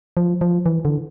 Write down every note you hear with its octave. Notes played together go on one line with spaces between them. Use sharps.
F3
F3
E3
D3